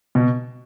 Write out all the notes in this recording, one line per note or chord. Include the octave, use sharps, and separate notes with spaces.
B2